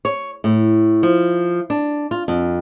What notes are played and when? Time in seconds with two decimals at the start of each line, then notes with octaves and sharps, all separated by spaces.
0.05 C#5
0.44 A2
1.03 F3
1.70 D4
2.11 F4
2.28 F2